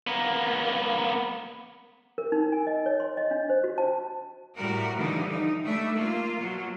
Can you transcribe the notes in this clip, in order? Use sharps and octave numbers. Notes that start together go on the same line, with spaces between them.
A#3 B3
A#4
D#4
G#5
D#5
C#5
C6
D#5
D4
C5
F#4
A5
A2 G3 F#4 A#4
D3 E3 F3 G3 D#4
D#4
G3 A3 D4 E5
A#3 F4
B2 F#3